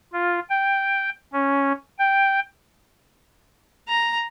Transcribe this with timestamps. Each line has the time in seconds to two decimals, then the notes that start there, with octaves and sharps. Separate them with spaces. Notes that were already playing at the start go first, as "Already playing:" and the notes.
0.13 F4
0.50 G5
1.33 C#4
1.99 G5
3.88 A#5